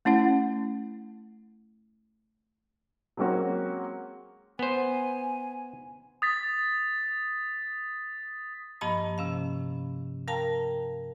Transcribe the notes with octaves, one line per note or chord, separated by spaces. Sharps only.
A3 C#4 E4 F#5
F#3 G#3 A#3 C4 C#4 F#4
B3 C5 G#5
D#6 A6 B6
G2 F3 A#3 D#5 A5 B5
C3 C#4 F5
A#4 F5 G5 A5 A#5